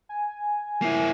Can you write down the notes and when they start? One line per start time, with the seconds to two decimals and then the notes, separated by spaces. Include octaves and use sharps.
0.09 G#5
0.82 A#3 E4